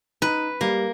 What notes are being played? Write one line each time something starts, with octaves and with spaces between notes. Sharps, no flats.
D#4 B4
G3 A#3